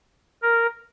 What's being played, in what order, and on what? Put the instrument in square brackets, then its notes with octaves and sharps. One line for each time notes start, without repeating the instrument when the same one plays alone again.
[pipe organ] A#4